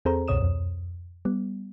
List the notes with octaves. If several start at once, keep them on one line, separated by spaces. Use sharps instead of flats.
E2 C4 G#4 A4 C5 A#5
C#2 F#2 B2 C#5 D#6 E7
F2
G3 B3